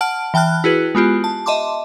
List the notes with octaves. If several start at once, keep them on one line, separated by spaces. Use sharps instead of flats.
F#5 A5 F6 D7
E3 G5 A5 F6 F#6
E4 F#4 G#4 B4
G#3 B3 F4 G4
A5
D#5 E5 A5 C6 D6